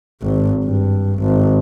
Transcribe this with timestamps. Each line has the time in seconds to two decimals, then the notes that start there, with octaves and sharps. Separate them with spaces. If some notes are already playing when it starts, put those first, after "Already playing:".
0.23 G#1
0.64 G2
1.20 G#1